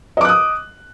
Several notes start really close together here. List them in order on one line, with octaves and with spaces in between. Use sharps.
D#5 D6 F#6 D#6